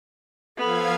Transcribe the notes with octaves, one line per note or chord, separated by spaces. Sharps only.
F3 B3 A4 F5 G#6